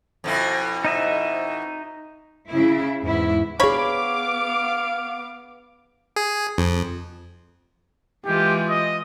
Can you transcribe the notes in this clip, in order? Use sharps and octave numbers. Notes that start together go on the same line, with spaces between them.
F2 B2 E4
D#4 D#5 E5
C#3 E4
E2 G#2 E4
B3 D4 G#4 C#5 F5 B5 D6
G#4
F2
E3 G#3 F4 G4
D#5